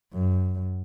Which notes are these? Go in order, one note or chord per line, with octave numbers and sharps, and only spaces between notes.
F#2